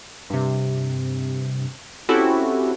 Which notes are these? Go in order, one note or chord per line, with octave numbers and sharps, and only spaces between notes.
G2 C3
C4 C#4 E4 F#4 G4 A4